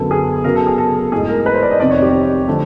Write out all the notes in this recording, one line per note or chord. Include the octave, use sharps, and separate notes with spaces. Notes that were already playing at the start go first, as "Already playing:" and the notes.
Already playing: F#2 D3 F#3 B3 A4
G#4
C#3 F#3 B3 A#4
A4
G#4
A4
G#2 E3 A3 G#4
A#4
B4
C5
D5
D#5
F2 C3 D#3 D5
C#5
G4
D3 F3 A3 C4